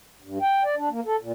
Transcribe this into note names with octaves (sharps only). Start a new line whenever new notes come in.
G2
G5
D5
D4
A#3
A4
A#2